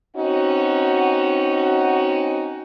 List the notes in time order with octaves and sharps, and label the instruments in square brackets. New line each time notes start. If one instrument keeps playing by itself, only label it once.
[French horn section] C4 C#4 D#4 F#4